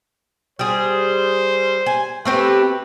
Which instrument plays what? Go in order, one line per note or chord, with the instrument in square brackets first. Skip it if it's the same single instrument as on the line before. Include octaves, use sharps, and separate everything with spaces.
[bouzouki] G3 G#4 [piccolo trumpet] C5
[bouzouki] G#5
[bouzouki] A3 C4 G4 [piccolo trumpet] B4